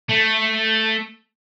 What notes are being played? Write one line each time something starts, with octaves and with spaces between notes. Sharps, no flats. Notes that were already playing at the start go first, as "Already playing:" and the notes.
A3